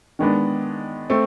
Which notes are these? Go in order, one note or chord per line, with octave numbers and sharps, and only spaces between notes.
D#3 G#3 B3 D4
A3 C4